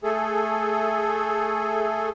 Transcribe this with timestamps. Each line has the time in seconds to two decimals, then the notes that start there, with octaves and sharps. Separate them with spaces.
0.03 A3 G#4 A4